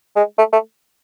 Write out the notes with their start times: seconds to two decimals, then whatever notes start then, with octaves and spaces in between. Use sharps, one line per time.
0.16 G#3
0.38 A3
0.52 A3